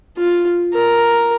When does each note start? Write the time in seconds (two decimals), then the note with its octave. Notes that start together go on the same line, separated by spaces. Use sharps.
0.18 F4
0.73 A#4